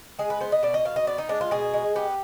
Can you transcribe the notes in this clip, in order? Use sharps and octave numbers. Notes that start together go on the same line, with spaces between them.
G#3 G#4
B4
B3 C5
D#5
B2 D5
D#5
B2 F5
D#5
B3 D5
D#4
G#3 D4
F4
B2 G#4
G#3
B3 G4